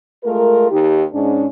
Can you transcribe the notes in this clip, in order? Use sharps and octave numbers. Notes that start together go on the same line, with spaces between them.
G#3 A3 F4 A#4
D#2 D#3 D#4 G4
G#2 C#4 D4